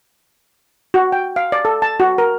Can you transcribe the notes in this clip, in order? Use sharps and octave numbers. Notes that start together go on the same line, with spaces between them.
F#4
G5
F5
D5
A4
A5
F#4
A#4